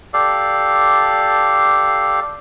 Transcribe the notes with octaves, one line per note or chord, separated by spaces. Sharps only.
G4 A4 D5 F5